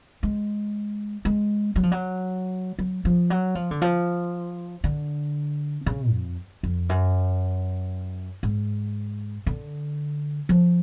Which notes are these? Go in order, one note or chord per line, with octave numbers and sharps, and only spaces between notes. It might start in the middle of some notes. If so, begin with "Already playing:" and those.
G#3
G#3
F#3
F3
F#3
F#3
F3
F#3
F3
D3
F3
D3
C#3
F2
F2
F#2
G#2
D3
F3